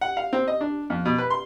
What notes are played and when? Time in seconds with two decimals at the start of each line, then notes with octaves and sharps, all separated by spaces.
0.01 F#5
0.17 F5
0.33 C4
0.48 D#5
0.61 D4
0.90 F2
1.05 B2
1.18 B4
1.30 C6